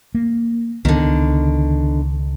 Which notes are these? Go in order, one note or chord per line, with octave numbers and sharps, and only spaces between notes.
A#3
C#2 D3 D#3 B3